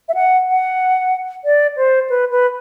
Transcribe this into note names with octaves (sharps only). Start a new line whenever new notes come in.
E5
F#5
F#5
D5
C5
B4
B4